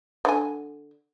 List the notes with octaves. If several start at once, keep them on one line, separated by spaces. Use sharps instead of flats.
D3 G#5